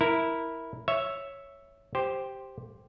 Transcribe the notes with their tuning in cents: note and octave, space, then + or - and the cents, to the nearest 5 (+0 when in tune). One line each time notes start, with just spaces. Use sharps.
E4 -10 A#4 +0
C#5 +0 E5 +0
G4 +0 C5 +0